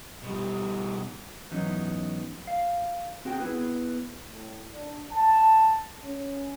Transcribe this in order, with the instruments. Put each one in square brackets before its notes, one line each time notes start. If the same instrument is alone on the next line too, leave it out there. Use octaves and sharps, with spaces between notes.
[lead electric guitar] B2 G3
[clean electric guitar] G#2 E3 F#3 B3 C#4 D#4
F5
C4 F#4 G#4 G5
B3 E4 G#4 B4
[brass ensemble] A2
D4
A5
C#4